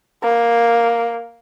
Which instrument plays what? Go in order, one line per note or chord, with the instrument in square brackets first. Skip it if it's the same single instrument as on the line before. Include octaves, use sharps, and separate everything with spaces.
[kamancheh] A#3